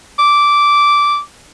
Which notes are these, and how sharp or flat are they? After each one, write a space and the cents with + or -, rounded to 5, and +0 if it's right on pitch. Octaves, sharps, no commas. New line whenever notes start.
D6 -10